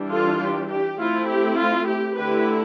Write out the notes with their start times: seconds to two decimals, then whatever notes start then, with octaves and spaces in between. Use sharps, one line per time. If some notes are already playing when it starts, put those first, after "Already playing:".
Already playing: E3 G3 D4
0.10 F4 A4
0.40 G4
0.69 G4
0.99 A3 C4 E4 F4
1.27 G4
1.57 F4
1.86 G4
2.16 D3 A3 E4 G4 B4